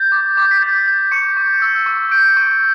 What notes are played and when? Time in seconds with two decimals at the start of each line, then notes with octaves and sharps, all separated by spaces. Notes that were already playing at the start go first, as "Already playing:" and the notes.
Already playing: G6 A6
0.12 D6
0.37 D6
0.51 B6
0.62 G6 A6
0.86 G6
1.11 C#6 C#7
1.37 C#6
1.62 E6
1.86 C#6
2.11 G6 D7
2.37 C#6